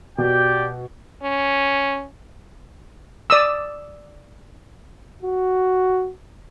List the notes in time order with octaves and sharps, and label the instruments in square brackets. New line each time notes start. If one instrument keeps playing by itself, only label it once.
[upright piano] B2 [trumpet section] G4 D5 G5
[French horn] C#4
[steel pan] D5 D#6 E6
[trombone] F#4